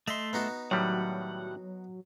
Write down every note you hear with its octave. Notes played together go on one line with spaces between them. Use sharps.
A3 D#5 E5 C6
B3 D#4 F#4
A2 D#3 F#3 G3 F#5